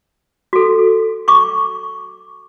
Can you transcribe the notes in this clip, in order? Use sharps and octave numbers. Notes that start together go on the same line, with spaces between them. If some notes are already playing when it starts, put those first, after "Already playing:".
F#4 A4
C#6 D6